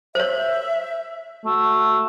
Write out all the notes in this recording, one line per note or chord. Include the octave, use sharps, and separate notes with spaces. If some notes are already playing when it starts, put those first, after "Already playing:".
C5 C#5 E5
A3 F#4